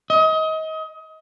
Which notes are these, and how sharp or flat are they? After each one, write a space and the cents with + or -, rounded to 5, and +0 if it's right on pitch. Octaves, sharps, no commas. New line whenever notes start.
D#5 +30